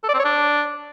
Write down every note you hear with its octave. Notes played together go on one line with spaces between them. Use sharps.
A4
D5
C4
C#5
D4